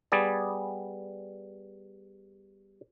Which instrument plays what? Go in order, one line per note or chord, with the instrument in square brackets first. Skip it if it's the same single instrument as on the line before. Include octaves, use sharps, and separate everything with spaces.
[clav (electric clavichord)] G3 B3 G#4 D5